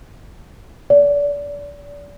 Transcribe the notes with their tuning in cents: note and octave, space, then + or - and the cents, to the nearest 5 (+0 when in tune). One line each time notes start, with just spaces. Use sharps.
D5 -30